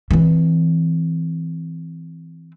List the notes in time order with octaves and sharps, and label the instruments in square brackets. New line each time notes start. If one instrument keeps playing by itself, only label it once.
[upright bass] E3 C4